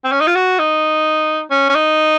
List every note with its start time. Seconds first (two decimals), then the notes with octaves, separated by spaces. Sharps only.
0.04 C4
0.12 C#4
0.21 D#4
0.27 F4
0.35 F#4
0.59 D#4
1.51 C#4
1.70 C#4
1.75 D#4